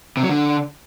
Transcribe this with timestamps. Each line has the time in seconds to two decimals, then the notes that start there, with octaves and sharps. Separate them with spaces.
0.17 C3
0.23 F#3
0.29 D3